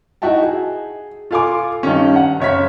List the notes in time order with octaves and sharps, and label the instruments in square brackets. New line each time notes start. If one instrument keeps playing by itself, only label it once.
[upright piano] D#4 E4 F#4 E5 G5 A5
G#4
F4 A4 F5 G#5 C6 D6
G2 D#3 C#4
F#5
F#1 C#3 C#5 E5 F6 B6